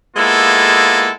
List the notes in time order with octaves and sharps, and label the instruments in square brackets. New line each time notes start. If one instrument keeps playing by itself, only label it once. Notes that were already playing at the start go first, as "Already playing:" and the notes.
[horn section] G#3 A#3 B3 E4 F4 A4